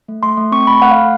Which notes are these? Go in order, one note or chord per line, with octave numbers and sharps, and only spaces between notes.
A3
A3 C6
A3
C4 C#6
A3 B5
A3 F#5
F5
A3